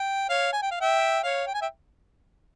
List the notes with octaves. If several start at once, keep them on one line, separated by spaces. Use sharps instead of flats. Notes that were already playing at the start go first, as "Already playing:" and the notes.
Already playing: G5
C#5 F5
G#5
G5
F5
E5 G5
C#5 F5
G5
G#5
E5 G5